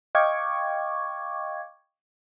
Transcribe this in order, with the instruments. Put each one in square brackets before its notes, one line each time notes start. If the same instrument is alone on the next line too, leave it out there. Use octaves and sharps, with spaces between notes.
[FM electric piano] D#5 F5 G5 C#6 D6 G#6